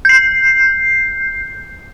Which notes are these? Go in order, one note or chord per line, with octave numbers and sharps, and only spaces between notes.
G6 C7